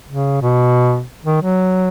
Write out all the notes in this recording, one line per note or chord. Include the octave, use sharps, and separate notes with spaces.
C#3
B2
D#3
F#3